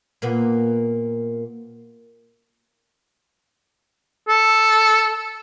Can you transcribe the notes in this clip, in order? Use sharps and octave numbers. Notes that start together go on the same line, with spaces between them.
A#2 A#3 B3
A4